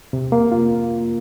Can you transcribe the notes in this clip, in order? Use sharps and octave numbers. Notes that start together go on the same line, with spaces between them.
C3
A#3
F4